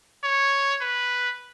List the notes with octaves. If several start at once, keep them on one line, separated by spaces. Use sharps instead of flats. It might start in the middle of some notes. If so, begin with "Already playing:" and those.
C#5
B4